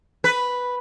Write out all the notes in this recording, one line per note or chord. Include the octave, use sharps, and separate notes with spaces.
B4